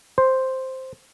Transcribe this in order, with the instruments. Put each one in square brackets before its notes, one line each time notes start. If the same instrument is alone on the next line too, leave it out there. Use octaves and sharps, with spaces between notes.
[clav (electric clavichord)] C5